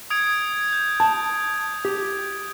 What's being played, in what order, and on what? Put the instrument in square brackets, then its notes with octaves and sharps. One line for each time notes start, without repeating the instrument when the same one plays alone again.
[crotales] D#6 G#6 D7
G6
[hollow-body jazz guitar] A5
G4